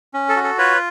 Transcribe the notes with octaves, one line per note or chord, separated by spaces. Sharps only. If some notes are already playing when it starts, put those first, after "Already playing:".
C#4
A4
F#4
A4
F4 B4 C#5